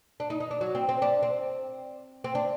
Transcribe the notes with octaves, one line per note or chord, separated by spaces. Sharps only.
D4
D#4
D#4
D4
F#3
C4
C4
D4
C4
C4
D4